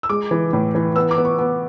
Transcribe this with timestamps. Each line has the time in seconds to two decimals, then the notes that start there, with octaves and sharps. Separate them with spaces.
0.03 E6
0.09 G#3 D6
0.31 E3
0.53 A2
0.75 E3
0.96 B3 E6
1.11 D6
1.18 B3
1.25 C#6
1.39 B3